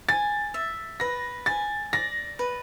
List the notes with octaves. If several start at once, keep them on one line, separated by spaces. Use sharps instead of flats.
G#5 A6
E5
B4 A#6
G#5 A6
D5 A#6
B4